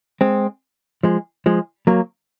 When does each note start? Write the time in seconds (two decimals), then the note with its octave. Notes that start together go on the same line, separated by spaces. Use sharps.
0.21 G#3 C4
1.03 F3 G#3
1.46 F3 G#3
1.87 F#3 A#3